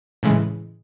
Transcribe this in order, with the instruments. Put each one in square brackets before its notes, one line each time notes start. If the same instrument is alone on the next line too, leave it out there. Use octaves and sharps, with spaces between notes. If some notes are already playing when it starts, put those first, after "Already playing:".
[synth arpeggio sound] A2 C#3 E3 G#3